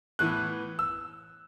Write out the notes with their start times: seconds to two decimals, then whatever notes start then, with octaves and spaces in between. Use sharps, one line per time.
0.19 A2 E3 B3 F#6
0.79 E6